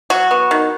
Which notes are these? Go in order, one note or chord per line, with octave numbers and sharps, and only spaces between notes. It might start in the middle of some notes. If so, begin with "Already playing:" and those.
F#3 F#4
B3
D#3